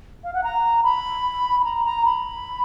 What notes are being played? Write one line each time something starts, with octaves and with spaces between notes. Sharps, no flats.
F5
F#5
A#5
B5
B5
A#5
A#5
B5